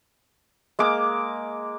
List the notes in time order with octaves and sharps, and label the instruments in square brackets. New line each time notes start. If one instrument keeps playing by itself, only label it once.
[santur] G#3 A#3 A#5 D6